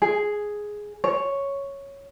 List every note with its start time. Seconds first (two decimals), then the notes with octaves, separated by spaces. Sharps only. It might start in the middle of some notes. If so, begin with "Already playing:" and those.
0.02 G#4
1.04 C#5